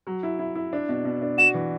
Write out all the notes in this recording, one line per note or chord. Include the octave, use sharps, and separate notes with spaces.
F#3
E4
E4
E4
D4
B2
B2
D4
F#4 E7
E3